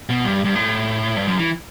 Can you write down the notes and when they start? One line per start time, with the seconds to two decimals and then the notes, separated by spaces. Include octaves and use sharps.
0.09 B2
0.24 G2
0.44 G2
0.55 A2
1.17 G2
1.27 F#2
1.38 E3